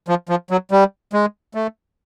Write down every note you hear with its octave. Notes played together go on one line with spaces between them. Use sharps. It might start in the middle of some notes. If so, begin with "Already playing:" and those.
F3
F3
F#3
G3
G#3
A3